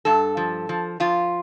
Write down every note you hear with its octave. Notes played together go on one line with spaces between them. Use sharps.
G2 A4
F3
F3
F3 F4